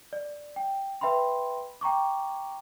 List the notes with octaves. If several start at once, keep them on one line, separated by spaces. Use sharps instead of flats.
D5
G5
B4 E5 G5 B5 C6
G5 A#5 C#6 D6